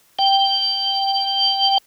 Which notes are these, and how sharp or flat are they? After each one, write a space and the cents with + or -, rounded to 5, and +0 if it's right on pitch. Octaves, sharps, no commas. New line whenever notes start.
G5 +0